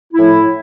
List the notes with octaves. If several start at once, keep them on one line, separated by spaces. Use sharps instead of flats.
A2 F3 E4